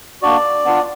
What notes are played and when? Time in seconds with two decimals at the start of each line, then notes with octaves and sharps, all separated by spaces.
0.22 A#3 D4 F#4 D5
0.65 B3 D4 F4